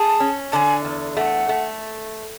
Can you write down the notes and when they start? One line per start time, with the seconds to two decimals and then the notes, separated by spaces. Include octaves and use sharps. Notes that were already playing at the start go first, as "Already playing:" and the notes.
Already playing: G#4 A5
0.20 C#4
0.52 D3 G#5 A5
0.85 E2
1.17 A3 F#5
1.49 A3